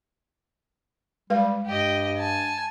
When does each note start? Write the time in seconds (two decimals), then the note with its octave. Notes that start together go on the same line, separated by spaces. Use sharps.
1.30 G3 G#3 B4 F5
1.66 G2 G4 D#5
2.18 G#5 A5